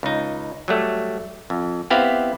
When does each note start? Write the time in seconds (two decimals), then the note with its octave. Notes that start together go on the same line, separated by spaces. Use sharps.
0.03 C#2 D#4
0.68 F#3 G3 A3
1.50 F2
1.90 B3 C4 E4 G4 F5